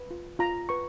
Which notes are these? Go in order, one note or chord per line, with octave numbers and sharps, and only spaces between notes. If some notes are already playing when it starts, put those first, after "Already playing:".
Already playing: B4
F4
F4 A#5
B4 C#6